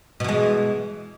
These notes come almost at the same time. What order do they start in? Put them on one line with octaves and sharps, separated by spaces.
B2 E3 G#3